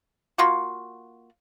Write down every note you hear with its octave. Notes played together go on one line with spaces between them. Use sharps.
A#3 F4 F#4